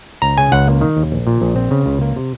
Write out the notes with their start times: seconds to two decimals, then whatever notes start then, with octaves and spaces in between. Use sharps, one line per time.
0.22 C#2 A#5
0.38 C#3 G#5
0.52 C#2 F#5
0.67 A#3
0.81 D#3
0.97 D#2
1.12 A#1
1.27 A#2
1.42 A#1
1.56 C4
1.71 C#3
1.86 C#2
2.01 A#3
2.16 C3